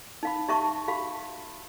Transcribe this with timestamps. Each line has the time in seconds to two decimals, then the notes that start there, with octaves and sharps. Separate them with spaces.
0.23 D#4 F5 B5
0.48 D#4 G4 E5 A5 C#6
0.88 F#4 G4 F5 B5